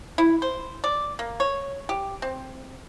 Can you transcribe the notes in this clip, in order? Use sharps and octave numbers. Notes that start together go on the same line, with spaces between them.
E4
C5
D5
A#3
C#5
G4
C4